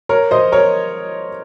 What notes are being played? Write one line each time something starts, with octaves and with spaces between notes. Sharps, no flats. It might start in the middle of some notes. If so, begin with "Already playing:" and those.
A#4 C#5
C5 D#5
A#4 C#5